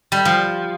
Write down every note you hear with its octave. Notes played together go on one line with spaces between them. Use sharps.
G3
F3